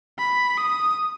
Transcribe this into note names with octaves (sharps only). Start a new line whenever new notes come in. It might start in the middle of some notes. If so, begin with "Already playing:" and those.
B5
D#6